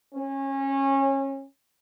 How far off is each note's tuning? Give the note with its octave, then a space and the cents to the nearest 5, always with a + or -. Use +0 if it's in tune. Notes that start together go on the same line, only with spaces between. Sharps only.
C#4 -25